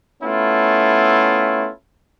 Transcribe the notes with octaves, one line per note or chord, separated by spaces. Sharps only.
A3 B3 C#4 E4 F4